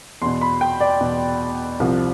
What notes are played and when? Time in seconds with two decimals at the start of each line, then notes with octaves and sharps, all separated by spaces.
0.22 E2 B2 C6
0.41 B5
0.61 G5
0.81 D5
1.01 E2 B2
1.80 C2 C3 F3